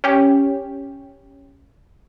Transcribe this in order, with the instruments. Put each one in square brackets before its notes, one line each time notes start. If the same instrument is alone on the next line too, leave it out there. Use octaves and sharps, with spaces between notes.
[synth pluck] C#4 G4